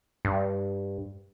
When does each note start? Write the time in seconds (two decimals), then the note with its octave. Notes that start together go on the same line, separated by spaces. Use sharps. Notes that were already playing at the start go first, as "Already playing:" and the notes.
0.25 G2